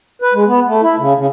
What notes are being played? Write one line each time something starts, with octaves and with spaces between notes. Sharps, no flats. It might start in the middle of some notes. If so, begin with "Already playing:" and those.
B4
G#3
B3
A3
E4
C#3
C#3